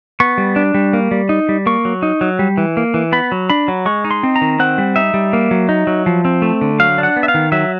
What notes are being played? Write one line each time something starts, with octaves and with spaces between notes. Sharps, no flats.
B3 C#6
G3
D4
G3
A#3
G3
D#4
G3
A#3 C#6
F#3
D#4
F#3
G3
E3
A#3
E3
B3 B5
F#3
D4 B5
F#3
G#3 C#6
D#4
C6
C4
A#5
D#3
C4 F#5
G3
D#4 E5
G3
A#3
F#3
D#4
F#3
F3
C4
A3
D3
F#3 F5
D4
F#5
B3
E5
F5
D#3
F#3 E5